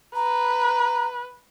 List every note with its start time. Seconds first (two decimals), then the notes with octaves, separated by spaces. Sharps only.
0.15 B4 A#5